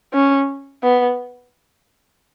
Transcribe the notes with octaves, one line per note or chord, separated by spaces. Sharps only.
C#4
B3